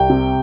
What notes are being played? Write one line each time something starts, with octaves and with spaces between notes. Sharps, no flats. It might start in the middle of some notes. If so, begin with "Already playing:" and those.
Already playing: C2 G5
C3